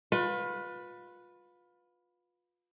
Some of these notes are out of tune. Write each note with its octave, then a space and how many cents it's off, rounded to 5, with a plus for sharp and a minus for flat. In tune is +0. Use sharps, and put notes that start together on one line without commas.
F4 +30 B4 +0